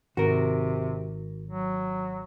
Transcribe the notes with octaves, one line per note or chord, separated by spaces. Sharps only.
G#1 C3 F#4 A#4
F#3